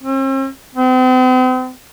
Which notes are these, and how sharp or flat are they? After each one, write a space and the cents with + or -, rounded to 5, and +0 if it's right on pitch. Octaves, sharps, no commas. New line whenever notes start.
C4 +45
C4 -40